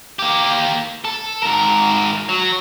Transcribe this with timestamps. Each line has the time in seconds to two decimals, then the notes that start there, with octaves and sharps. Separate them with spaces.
0.19 A#3 G4
1.05 A4
1.43 G#2 A#4
2.29 F#3